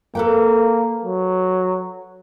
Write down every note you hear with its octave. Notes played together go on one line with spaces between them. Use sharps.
A#3 A4 B4 G5
F#3